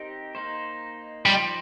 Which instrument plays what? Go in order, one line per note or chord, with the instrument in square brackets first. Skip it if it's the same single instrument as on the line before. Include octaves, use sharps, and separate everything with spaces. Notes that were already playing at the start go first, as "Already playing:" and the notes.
Already playing: [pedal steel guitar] C4 D#4 G4 A#4
A#3 D#4 C5
[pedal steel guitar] F3 D#4 C5 [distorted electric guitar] G3